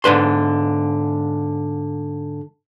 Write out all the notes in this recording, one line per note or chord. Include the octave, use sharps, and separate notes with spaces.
G#2 D3 B4 C6